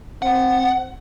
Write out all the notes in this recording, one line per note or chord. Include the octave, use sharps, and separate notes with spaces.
C4 F#5